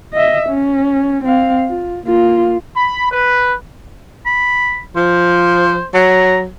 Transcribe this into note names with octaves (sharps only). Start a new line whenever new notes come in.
D#5 E5
C#4
C4 F5
F4
A#3 F4
B5
B4
B5
F3 C5
F#3 A#5